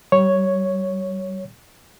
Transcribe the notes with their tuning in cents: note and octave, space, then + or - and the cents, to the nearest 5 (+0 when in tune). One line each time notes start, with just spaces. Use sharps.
G3 -35 C#5 +0